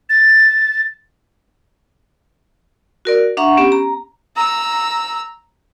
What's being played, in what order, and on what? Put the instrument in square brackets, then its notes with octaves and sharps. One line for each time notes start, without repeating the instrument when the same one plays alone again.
[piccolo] A6
[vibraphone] F#4 A#4 D5
D4 E5 F#5 A#5 C#6
B3 C#4 G4
A#5
[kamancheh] A#5 E6